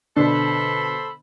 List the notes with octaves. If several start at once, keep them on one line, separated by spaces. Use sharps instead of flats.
B2 D3 D4 A4 C5 B5